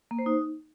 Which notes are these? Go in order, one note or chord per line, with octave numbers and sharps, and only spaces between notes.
A#3
C5
D#4